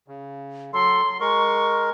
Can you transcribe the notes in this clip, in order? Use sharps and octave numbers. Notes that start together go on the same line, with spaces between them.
C#3
F#3 A4 C6
G#3 A#4 C#6